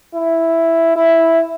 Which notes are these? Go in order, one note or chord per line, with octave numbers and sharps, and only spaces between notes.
E4
E4